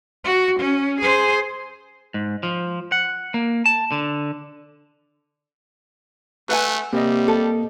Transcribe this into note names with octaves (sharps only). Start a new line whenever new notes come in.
F#4
C#4
G#4 C5
G#2
F3
F#5
A#3
A5
D3
A3 B4 F#5 G#5
C3 G3 A#3 D#5
A4